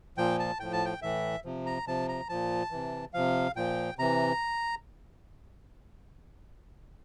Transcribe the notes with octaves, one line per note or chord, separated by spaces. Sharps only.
A#2 F3 G5
A5
A2 F3 G5
A5
G5
A2 E3 E5
C3 F3
A#5
C3 F3 A5
A#5
A#2 F3 A5
C3 E3
C3 F3 F5
A#2 F3 G5
C3 E3 A#5